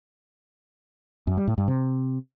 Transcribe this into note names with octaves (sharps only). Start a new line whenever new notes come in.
F#2
G3
A2
G2
C3